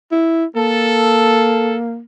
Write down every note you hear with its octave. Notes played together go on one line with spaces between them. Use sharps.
E4
A#3 A4